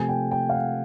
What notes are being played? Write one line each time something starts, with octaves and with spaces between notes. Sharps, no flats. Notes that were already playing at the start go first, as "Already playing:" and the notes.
Already playing: C3 F3 A3 C4 G#5
G5
G5
F5
F#5